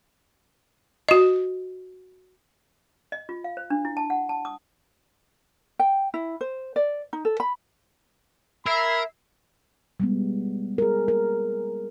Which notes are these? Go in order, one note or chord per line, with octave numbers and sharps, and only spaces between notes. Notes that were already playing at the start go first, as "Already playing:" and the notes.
F#4 D#5
D#5
F4
F5
C5
D4
E4
A5
F#5
A5
D#6
G5
E4
C5
D5
D#4
A4
B5
A#4 E5 B5 E6 G#6 C7
G3 G#3 B3
G#4 A#4
A#4